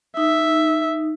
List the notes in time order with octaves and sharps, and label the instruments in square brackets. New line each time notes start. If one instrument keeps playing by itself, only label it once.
[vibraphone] D#4 [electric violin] E5